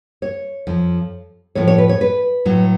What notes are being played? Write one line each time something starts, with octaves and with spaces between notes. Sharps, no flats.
C#5
F2 F3
A2 F3 C#5
C#5
B4
C#5
B4
A2 F#3